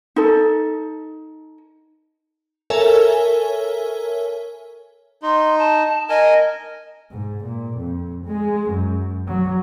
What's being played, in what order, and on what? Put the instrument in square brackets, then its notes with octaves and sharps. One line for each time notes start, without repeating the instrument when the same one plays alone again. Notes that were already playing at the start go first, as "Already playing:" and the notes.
[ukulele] D#4 A4
[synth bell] A4 A#4 C#5 E5 G#5
[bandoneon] D#4 [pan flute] C6
[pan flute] A5
[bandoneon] A#4 G#5 [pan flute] D#5
[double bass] G#2
A#2
F2
G#3
F#2
F#3